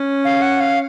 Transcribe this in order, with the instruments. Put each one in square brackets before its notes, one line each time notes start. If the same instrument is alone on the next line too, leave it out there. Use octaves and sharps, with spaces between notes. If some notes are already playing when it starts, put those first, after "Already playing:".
Already playing: [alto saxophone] C#4
[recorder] F5
F#5
F5